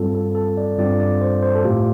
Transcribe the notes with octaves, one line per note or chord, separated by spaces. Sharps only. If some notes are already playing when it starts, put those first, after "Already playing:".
Already playing: G2 G3 C4 F4 A4
A4
A4
D5
G2 G3 C4 F4 D5
D5
C5
C5
A4
A2 A3 F4 G4